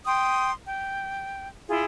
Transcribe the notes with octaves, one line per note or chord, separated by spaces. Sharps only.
G5 C6 D#6
G5
E4 F4 G#4